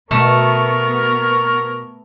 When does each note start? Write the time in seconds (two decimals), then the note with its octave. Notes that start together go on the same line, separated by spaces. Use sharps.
0.11 B2 A3 B3 A#4 C#5